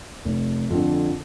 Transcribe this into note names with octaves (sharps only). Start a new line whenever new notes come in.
F1
F2 D3